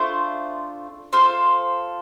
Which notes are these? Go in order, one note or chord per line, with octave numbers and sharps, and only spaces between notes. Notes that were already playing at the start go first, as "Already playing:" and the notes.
Already playing: A3 D4 F4 C5
F4 A4 C5